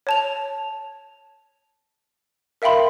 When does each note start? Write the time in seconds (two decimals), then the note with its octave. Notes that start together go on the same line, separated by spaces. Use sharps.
0.07 C#5 A5 F7
2.62 A#4 E5 F5 G5 B5 C6